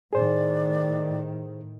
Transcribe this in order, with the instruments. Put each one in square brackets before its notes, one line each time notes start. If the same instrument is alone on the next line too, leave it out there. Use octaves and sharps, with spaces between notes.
[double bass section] A2 D#3 [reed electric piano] G#4 C5 [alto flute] D5